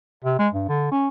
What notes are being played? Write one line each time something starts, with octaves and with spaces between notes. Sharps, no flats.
C3
G#3
G2
D3
C#4